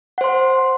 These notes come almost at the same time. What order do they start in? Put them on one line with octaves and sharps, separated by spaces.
F#5 C5 C6